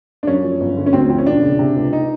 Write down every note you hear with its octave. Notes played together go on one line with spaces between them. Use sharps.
D4
F#2 C#4
F3
G1
D3
C#4
D2 C4
F3 C4
C#4
E1 D4
C#3
C3
C#2
D#4